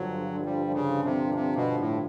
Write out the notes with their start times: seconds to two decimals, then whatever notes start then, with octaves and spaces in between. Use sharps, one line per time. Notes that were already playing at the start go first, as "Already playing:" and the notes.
Already playing: G2 D3 F3 F#3
0.46 G3
0.74 C#3
1.05 C3
1.35 C3
1.56 B2
1.79 A2